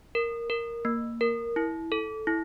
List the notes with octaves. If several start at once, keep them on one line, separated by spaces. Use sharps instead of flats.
A#4
A#4
A#3
A#4
E4
A4
E4